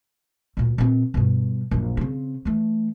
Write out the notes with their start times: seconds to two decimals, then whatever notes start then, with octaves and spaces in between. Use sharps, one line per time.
0.57 D2 A#2
0.78 A#2 C4
1.14 G2 B2
1.71 A#1 F#2
1.97 C#3 C4
2.45 E3 A3